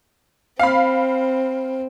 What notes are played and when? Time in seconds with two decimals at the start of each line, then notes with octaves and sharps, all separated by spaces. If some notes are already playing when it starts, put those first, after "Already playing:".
0.59 C4 F5 B5